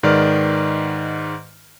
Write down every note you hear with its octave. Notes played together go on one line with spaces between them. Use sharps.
G#2 D#3 B4 D5 F6